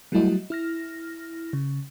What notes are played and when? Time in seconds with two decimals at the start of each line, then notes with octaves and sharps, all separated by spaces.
0.12 F#3 G3 A3 E4 F#4 D#5
0.50 E4 F6 A#6
1.53 C#3